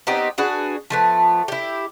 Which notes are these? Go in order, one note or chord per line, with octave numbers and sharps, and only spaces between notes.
B3 C4 D#4 G4
D4 F#4 G#4 B4
F3 A3 B3
E4 G4